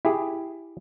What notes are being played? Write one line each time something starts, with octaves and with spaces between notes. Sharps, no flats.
E4 G4 G#4